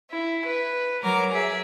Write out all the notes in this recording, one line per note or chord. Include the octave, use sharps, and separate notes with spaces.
E4
B4
F#3 A#4 D6
G#4 E5